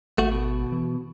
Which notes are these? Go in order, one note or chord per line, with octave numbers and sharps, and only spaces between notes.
G#1 A3 F#4
B2
E3